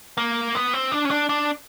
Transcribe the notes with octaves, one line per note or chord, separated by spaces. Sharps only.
A#3
B3
C4
D4
C#4
D4
D4